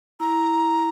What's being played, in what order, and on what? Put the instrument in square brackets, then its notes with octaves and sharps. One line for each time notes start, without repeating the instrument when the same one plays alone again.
[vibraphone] E4 [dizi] A#5